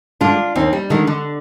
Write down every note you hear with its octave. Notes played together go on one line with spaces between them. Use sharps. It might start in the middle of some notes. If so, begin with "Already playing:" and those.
D3 G#3 D4 F4
D#2 C4 D#4
G3
D3 D#3 G#3
D3